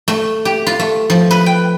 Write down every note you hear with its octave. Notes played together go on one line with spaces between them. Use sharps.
A3
G4
F4
A3
F3
B4
G5